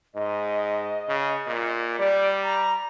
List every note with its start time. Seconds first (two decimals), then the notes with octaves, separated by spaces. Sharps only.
0.15 G#2 D#5
1.08 C#3
1.47 A#2
1.99 G3 D5
2.43 A#5